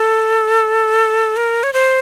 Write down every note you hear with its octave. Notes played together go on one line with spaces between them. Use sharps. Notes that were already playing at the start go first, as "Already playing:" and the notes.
Already playing: A4
A#4
C#5
C5